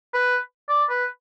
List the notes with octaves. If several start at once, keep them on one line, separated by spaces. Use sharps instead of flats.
B4
D5
B4